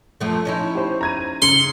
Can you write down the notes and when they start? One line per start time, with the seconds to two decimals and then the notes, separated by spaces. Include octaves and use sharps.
0.21 F#2 F3 A3
0.45 C#4 D#4 E4
0.75 G4 C5
1.01 A#5 G#6 D#7
1.42 C#3 C6 C#7